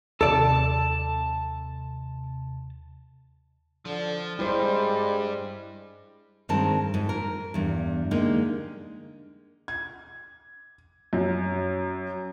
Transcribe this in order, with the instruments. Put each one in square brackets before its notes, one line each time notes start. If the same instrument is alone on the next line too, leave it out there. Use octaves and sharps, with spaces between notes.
[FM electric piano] D#2 C3 [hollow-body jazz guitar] A4 D5 [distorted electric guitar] A5
[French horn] D3 [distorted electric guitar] F3
[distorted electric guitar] G2 [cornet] G3 [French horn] G#3 [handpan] E4 C5
[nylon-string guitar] G2 D#3 G#3 C4 A#4 A5
G#2
A#4
E2 G2
D3 G#3 A#3 D#4 G4
[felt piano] G#6
F#2